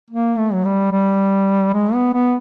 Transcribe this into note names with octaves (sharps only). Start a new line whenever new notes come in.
A#3
A3
F#3
G3
G3
G#3
B3
B3